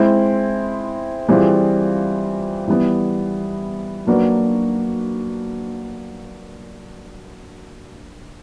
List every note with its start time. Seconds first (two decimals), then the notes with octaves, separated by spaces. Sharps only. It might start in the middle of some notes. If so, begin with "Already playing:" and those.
Already playing: G#3 C4 E4
1.29 E3 G3 C4 F4 G#4
2.68 E3 G3 B3
4.07 F#3 A#3 D4 F#4 B4